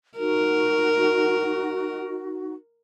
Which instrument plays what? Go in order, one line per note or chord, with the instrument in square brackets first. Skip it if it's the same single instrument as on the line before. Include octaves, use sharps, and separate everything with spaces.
[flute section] D#4 F#4 [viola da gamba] A#4